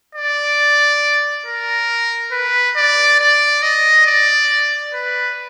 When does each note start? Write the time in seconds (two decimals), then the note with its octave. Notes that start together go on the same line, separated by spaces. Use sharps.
0.15 D5
1.46 A#4
2.32 B4
2.76 D5
3.20 D5
3.62 D#5
4.07 D5
4.94 B4